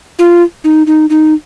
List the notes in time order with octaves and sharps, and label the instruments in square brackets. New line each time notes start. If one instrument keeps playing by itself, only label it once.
[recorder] F4
D#4
D#4
D#4